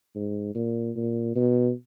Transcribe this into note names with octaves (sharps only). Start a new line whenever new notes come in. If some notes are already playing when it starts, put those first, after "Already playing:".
G#2
A#2
A#2
B2